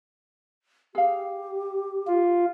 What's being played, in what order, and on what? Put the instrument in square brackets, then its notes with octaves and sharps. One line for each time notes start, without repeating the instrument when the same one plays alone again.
[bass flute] G4 [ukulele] G#4 F5
[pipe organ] F4